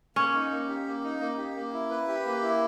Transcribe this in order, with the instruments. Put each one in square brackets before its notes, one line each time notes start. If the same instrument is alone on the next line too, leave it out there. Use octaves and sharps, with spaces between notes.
[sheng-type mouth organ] A#3 [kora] C#4
[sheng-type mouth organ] D#4
A#3
G4
A#3
D#4
A#3
G4
A#3
E4
B4
G4
A#3
E4